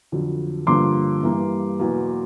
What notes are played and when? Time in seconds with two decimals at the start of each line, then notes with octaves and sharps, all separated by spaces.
0.12 F2 D3 F#3
0.67 G2 D3 F3 A#3 C6 D6
1.23 G2 E3 G3 A#3
1.79 E2 B2 F#3 A#3